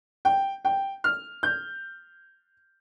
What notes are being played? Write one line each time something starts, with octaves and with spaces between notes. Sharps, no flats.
G5
G5
F6
G6